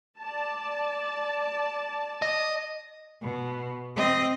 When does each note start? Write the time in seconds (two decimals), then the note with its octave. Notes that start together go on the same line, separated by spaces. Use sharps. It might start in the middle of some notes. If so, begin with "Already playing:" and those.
0.20 D5 A5
2.22 D#5
3.22 B2
3.96 C4 D#5